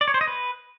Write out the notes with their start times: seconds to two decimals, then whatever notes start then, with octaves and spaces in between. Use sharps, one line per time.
0.01 D5
0.08 C#5
0.14 C5
0.21 D#5
0.28 B4